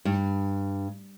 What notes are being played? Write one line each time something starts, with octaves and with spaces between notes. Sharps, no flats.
G2